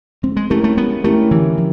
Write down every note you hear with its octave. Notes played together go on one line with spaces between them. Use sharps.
G#3 C4
G#3
A3 C#4 E4 G4 A#4
A3
G#3 B3
A3 C#4 E4 G4 A#4
D3 E3
F3